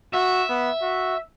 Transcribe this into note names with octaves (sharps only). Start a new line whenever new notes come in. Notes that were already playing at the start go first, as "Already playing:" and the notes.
F#4 E5
B3
F#4